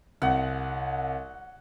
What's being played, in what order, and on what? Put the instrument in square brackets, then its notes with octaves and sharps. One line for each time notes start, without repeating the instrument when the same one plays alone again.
[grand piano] C2 [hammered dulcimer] F#5